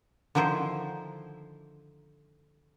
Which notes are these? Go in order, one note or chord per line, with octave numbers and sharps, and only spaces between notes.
D3 D#3 F3 E4 C5